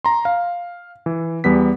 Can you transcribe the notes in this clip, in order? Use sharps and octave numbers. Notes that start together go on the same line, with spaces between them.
A#5 C6
F5
E3
E2 G3 B3 B6